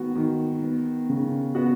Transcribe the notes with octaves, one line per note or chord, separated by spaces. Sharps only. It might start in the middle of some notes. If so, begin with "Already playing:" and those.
Already playing: D#3 B3 F#4
D#3
B3
C#3
B3 F#4